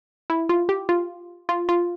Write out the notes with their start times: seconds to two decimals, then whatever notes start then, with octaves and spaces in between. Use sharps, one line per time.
0.30 E4
0.49 F4
0.69 G4
0.89 F4
1.49 F4
1.69 F4